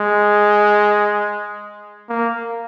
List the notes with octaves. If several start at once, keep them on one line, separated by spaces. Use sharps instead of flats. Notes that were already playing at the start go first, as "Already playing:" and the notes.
Already playing: G#3
A#3